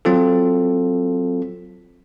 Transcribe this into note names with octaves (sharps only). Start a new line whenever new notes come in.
F#3 C4 F4 A4